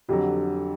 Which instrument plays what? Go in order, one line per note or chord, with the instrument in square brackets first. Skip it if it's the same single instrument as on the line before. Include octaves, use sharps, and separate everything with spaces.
[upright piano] F2 D3 F#3 [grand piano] G4